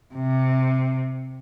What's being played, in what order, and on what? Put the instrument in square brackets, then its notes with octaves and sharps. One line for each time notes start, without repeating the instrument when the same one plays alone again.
[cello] C3